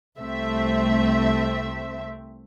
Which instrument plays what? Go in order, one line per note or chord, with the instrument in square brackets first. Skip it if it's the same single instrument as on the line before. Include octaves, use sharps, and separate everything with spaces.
[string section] C2 A3 C4 E5